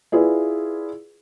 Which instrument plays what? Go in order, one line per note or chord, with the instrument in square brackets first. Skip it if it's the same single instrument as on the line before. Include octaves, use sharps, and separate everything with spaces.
[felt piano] E4 F4 G#4 B4 D5